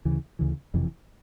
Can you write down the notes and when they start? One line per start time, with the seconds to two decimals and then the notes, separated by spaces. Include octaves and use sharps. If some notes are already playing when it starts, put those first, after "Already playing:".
0.05 D2 C#3 E3
0.39 D2 C#3 E3
0.74 F#1 F2 C3 E3